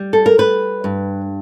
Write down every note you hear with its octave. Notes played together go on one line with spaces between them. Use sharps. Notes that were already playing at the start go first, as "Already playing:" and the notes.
Already playing: G3
A4
A#4
G3 B4
G2